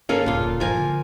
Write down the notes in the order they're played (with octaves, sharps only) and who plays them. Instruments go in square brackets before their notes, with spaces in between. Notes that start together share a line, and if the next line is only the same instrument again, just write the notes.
[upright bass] G2 [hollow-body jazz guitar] A#3 C#4 G#4 [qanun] A4 F5
[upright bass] E1 D2 [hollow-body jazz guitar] A#2 F4
[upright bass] G2 C4 [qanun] F3 A#4 G#5
[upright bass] D3